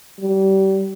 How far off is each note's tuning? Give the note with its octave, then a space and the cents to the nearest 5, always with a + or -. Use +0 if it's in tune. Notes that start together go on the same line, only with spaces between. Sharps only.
G3 -30